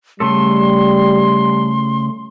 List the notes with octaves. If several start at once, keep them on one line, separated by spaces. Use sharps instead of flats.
C#3 G3 A3 A4 C6